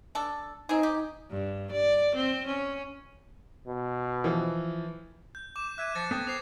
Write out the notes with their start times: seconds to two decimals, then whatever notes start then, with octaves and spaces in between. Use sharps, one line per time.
0.15 D4 A4
0.69 C4 D#4 G#4
0.83 G4
1.30 G2
1.72 D5
2.16 C4
2.47 C#4
3.67 B2
4.24 E3 F3
5.35 G6
5.56 D6 E7
5.78 E5 F#6 G#6 D#7
5.95 F3 A6 A#6 C#7
6.11 B3 A4 G5 D#6
6.27 C5 C7 F7